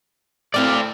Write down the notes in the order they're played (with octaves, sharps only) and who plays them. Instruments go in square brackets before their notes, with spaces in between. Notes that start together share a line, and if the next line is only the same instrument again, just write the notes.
[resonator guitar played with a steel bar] A3 C4 E4 [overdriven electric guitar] D5 F5